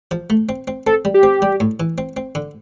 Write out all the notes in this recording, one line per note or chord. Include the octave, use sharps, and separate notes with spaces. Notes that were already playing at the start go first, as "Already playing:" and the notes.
F3
A3
C4
C4
C4 A4
G3
G4
C4
G3
A2
E3
C4
C4
D3